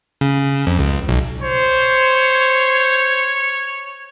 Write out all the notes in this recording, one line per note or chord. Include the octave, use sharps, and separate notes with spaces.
C#3
F2
C#2
B1
C5 C#5